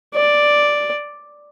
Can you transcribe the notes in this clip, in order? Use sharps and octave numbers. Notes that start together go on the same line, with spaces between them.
D5